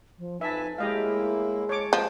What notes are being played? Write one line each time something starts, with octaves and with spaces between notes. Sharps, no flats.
F3
F2 D#4 B4 E5 G#5 A5
A2 G#3 A#3 E4 G4 D#5 F5
C#5 A5 D6
F3 A#3 B3